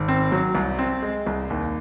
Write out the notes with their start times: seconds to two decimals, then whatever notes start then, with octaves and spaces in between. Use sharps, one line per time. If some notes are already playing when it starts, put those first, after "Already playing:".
Already playing: G#1
0.08 C4
0.32 F#3
0.55 C2
0.79 C4
1.03 G#3
1.27 C2
1.50 D#2